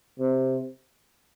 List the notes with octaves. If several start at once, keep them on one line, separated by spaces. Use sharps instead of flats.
C3